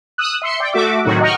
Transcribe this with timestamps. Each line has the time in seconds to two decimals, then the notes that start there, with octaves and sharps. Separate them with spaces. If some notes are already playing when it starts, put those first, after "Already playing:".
0.18 D#6 E6 F#6
0.42 E5 C6 C#7
0.60 D5 G5
0.73 A3 F#4 E5 D6
1.05 A2 C3 D#3 F#3 F#4
1.21 D#5 F#5 G5 A#5 C#6 F6